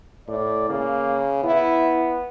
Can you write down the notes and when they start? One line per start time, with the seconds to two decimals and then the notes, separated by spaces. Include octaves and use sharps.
0.28 A2 D5
0.69 C#3 A#3
1.44 B3 E4